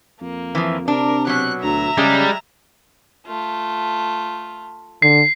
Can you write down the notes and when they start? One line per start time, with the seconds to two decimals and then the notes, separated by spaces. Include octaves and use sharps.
0.21 F2 A#3
0.55 E3 F3
0.88 C3 D4 A#4
1.27 B2 F#3 F#6
1.63 D2 E5 A#5
1.98 C#3 G3 G#3
3.27 A3 F4
5.02 D3 C7